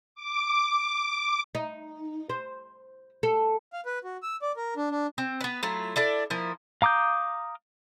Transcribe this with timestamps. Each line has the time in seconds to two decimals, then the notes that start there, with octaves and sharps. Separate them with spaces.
0.15 D6
1.55 D#4
2.30 C5
3.23 A4
3.73 F5
3.86 B4
4.04 F#4
4.23 E6
4.42 D5
4.57 A#4
4.77 D4
4.91 D4
5.18 C4
5.41 B3 B4
5.63 F#3 A3 E4 F4
5.96 D4 E4 A4 D5
6.30 F3 A#3 E4
6.82 F5 A#5 D6 D#6 G6